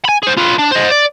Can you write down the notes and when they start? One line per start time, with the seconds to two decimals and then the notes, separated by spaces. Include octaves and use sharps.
0.05 G#5 B5
0.23 G#4 C5
0.38 F4 B4
0.59 D4
0.72 C5 D#5
0.91 D5